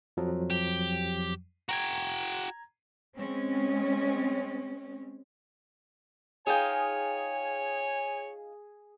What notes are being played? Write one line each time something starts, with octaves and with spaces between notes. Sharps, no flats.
F2 F3 F#3
G4
F#4 G5 A#5 G#6
G#3 C4 C#4
D#4 F4 G#4 C#5 G5 G#5 D#6